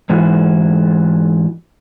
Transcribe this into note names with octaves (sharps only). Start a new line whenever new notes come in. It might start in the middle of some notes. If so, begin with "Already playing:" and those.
G#2 E3 F#4